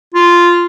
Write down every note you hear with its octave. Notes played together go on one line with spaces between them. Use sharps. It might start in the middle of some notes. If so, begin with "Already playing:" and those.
F4